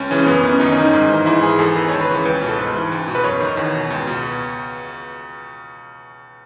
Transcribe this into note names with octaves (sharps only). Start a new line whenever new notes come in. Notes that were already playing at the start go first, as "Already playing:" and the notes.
Already playing: C#2 C#4
C#3 E3 C#4
F#2 B3
D#3 C#4
F#2 D#4
D#3 C#4
D#4
G#2
E3
G#2 E4
E3 G#4
E2 A4
D#3 B4
C#2 C#5
B4
C#3 E3
C#2 B4
B2
A4
G#2 B4
E3
C#2
B2
B4
F#2 C#5
D#3
E2
B2
C#2
B2